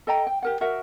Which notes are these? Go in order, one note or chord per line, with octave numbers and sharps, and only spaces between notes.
A4 D#5 G5 A#5
G5
G4 A#4 F#5
F#4 A#4 E5 F#5